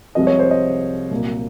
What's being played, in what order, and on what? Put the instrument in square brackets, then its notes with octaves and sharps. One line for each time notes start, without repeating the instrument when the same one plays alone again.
[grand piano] C2 C3 F3 G#3 D#5
C#5
C5
D#5
C2 A#2 F#3 A#3